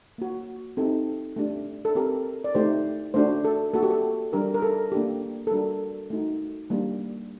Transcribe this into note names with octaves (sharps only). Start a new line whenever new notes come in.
A#3 F#4
C4 D#4 G4 A4
A3 D4 G4
A4
C4 G4 A#4
D5
A3 D#4 G4 C5
A3 D4 F#4 C5
A4
A#3 F#4 A4
G4
A4
G3 D4 G4 A#4
A#4
A4
A#3 D4 G4
A4
G3 D4 F#4 A#4
A3 D#4 F#4
G3 A#3 D4 G4